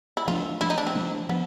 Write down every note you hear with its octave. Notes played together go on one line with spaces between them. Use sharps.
E4
F3 A3 D4 F4
F3 A3 D4 E4
D#4
D4
C4
F3 A3 D4
F3 B3